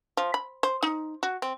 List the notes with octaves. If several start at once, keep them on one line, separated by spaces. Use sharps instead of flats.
F3
B5
C5
D#4
F#4
C4